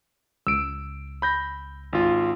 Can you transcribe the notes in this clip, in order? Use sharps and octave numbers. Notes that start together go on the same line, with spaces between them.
C#2 E6 D7
B5 G6 A#6
G#1 F4